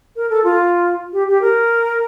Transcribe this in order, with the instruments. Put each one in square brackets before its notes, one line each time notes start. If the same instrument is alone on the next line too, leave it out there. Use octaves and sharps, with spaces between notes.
[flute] A#4
A4
F4
G4
G4
A#4